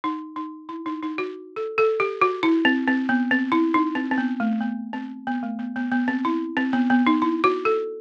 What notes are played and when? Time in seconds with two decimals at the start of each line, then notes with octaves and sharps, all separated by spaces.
0.04 D#4
0.36 D#4
0.69 E4
0.86 D#4
1.03 D#4
1.18 F#4
1.56 A4
1.78 A4
2.00 G4
2.21 F#4
2.43 E4
2.65 C4
2.88 C4
3.09 B3
3.31 C4
3.52 E4
3.74 D#4
3.95 C4
4.11 C4
4.18 B3
4.40 A3
4.61 B3
4.93 C4
5.27 B3
5.43 A3
5.59 B3
5.76 B3
5.92 B3
6.08 C4
6.25 E4
6.57 C4
6.73 B3
6.90 B3
7.07 D#4
7.22 E4
7.44 F#4
7.65 A4